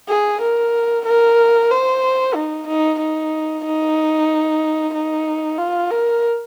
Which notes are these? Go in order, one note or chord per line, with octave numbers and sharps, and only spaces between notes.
G#4
A#4
A#4
C5
D#4
D#4
D#4
D#4
D#4
F4
A#4